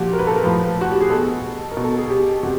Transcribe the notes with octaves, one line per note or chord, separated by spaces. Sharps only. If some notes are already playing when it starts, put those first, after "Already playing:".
Already playing: A#2 F3 F#4 G4
A#4
B4
A4
A#4
A2 F3 B4
F#4
G4
G#4
B2 A4
A#4
B2
A4
G#4
G4
C3 F#4